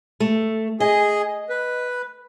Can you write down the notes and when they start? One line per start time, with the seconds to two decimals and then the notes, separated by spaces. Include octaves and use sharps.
0.20 A3
0.80 G#4 D#5
1.49 B4